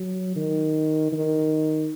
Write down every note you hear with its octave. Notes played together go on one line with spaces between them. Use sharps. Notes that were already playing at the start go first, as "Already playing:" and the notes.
Already playing: F#3
D#3
D#3